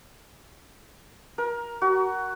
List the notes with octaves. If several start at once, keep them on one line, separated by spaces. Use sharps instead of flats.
A#4
F#4